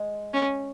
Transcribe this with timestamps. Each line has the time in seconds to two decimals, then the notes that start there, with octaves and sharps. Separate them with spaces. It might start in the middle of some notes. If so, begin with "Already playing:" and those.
Already playing: G#3
0.34 C#4